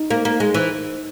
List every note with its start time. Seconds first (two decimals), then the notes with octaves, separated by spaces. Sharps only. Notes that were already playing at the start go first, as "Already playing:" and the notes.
Already playing: D#4
0.10 A#3
0.25 A#3
0.40 G#3
0.54 E3